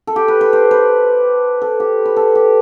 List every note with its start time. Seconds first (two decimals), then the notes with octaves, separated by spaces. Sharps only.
0.07 A4
0.16 G4
0.28 B4
0.41 B4
0.53 C5
0.71 B4
1.62 A4
1.80 G4
2.05 B4
2.17 A4
2.35 G4